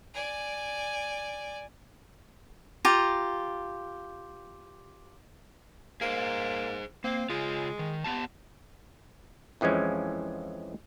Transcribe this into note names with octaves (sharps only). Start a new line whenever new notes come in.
D5 G#5
F4 G4 A#5
A#3 G#4 C5
A#3 C4
C#3 G#3 F4
D#3
B3 G4 A5
F2 E3 F3 G#3 C#4